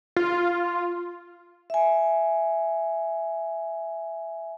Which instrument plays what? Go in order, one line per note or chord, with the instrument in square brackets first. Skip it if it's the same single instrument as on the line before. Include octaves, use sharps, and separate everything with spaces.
[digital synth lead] F4
[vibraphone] E5 G#5